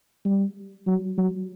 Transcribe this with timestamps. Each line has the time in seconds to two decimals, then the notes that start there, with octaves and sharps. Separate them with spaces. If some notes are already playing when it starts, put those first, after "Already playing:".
0.25 G3
0.87 F#3
1.18 F#3